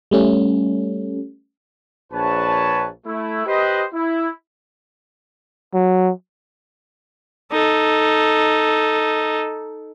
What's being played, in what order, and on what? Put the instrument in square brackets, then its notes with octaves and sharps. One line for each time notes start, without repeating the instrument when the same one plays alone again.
[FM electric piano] G3 A3 C#4
[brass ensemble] A#1 B4 C#5 A5
A3 E4
G4 B4 C5 D#5
E4
[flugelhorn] F#3
[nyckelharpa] D#4 A4